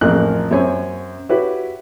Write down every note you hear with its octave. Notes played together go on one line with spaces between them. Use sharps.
A1 F2 A#3 G#4 A#4 F#6
F#2 C4 C#5 G#5
E4 F#4 G4 B4 C#5